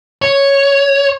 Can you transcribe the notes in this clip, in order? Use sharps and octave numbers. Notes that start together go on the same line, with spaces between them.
C#5